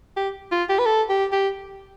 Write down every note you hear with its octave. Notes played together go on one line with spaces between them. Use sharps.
G4
F4
G4
B4
A4
G4
G4